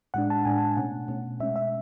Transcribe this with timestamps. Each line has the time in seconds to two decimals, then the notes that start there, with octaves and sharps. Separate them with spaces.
0.14 A2 G#3 D4 F#5
0.30 A5
0.45 A2 G#3 D4 G#5
0.77 B2 A3 C#4 F#5
1.08 B2 A3 C#4
1.40 B2 G#3 C#4 E5
1.56 E5